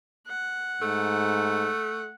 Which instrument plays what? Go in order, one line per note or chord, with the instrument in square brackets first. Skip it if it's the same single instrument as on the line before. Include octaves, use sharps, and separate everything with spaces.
[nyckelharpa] F#5
[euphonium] G#2 [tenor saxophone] A3